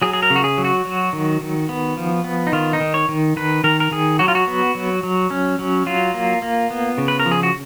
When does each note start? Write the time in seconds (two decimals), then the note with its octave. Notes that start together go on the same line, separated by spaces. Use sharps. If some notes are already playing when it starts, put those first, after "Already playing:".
0.02 F#3 G#4
0.13 G#4
0.23 A#4
0.30 C#3
0.36 F#4
0.44 G#4
0.58 F#3
0.64 F#4
0.85 F#3
1.13 D#3
1.41 D#3
1.69 B3
1.97 F3
2.24 B3
2.47 D#4
2.53 D#3 F4
2.73 D#4
2.80 D#3
2.94 C#5
3.09 D#3
3.37 D#3 B4
3.64 D#3 A#4
3.80 A#4
3.91 D#3 G#4
4.19 F#3 F#4
4.28 F4
4.35 F#4
4.48 B3
4.75 F#3
5.03 F#3
5.31 C#4
5.59 F#3
5.86 F#3 F4
6.14 A#3
6.42 A#3
6.71 B3
6.98 C#3
7.08 B4
7.20 A#4
7.26 F3
7.32 G#4
7.43 F#4